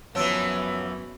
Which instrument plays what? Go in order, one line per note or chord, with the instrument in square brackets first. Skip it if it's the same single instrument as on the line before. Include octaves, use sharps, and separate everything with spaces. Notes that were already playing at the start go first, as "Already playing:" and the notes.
[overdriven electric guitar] F#2 [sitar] E3 F3 [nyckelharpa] B3 F#4 [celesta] C#5 E6 D7